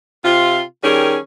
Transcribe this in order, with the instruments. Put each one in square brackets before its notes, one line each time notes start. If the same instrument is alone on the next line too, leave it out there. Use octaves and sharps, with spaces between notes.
[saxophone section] C3 F4
D#3 G3 C#4 G#4 A#4